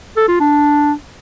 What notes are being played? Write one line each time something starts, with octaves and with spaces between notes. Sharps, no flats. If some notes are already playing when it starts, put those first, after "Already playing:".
A4
F4
D4